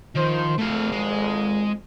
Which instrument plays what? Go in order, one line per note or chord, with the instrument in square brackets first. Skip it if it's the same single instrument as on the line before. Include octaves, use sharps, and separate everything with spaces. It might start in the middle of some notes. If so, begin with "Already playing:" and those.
[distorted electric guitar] D#3 [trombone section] F3 C5
[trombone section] G#1 F2 [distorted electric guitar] A3 F5
[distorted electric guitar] G#3